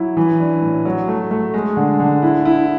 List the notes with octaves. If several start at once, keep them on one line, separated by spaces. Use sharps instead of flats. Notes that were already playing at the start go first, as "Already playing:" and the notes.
Already playing: F#3 E4
E3
D4
A2
F#3
A3
A3
G#3
D3
D3
E4
E4